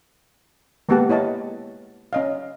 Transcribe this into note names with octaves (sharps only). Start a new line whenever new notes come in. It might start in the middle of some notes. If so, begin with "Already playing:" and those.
G#3 A#3 B3 G4 F#5 A5
E4 C#5 D#5 A5
C#4 D#5 F5